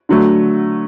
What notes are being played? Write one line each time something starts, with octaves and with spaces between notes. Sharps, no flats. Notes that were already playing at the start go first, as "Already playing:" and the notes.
D3 F#3 A3